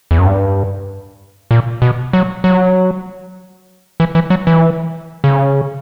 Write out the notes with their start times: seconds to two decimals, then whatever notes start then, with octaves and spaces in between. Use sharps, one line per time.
0.11 E2
0.19 F#2
0.26 G2
1.51 A#2
1.82 B2
2.13 F#3
2.44 F#3
4.00 E3
4.15 E3
4.30 F#3
4.47 E3
5.24 C#3